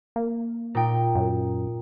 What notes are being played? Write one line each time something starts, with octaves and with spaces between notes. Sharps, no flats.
A#3
A#2 D#4 G5
F#2